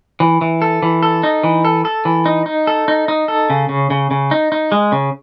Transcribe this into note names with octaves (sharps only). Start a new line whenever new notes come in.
E3
E3
A4
E3
A4
D#4
E3
A4
A4
E3
D#4
D#4
A4
D#4
D#4
A4
C#3
C#3
C#3
C#3
D#4
D#4
G#3
C#3